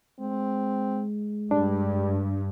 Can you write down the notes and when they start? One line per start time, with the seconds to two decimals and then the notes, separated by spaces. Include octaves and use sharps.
0.20 G#3 C4
1.51 G2 G3 D4